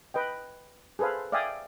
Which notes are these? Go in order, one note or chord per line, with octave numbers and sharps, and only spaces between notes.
B4 D#5 G5
G#4 A4 B4 C5 F5
D5 E5 F5 G5 G#5 D#6